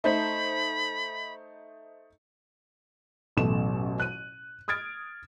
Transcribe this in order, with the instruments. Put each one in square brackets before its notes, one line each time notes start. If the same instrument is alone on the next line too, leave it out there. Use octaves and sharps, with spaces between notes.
[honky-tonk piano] A3 D#4 C5 [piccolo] B5
[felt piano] A1 F#2 B2 A3 E7
F#6 D#7
D#6 F6 G#6 A6 D7